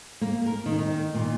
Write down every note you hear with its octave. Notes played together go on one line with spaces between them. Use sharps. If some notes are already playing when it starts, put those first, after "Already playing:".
A#3
A#4
D#3
D#3
A#2